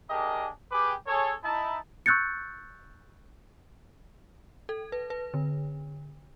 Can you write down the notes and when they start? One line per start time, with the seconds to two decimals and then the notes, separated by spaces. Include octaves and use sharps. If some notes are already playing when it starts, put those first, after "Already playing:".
0.11 A3 D4 G4 G#4 A#4 D#5
0.72 G4 G#4 B4 G5 D6
1.07 G#4 A4 C#5
1.44 D#4 E4 A5
2.06 C#6 E6 F#6 G6 A6 C#7
4.69 A4
4.92 B4
5.10 B4
5.34 D3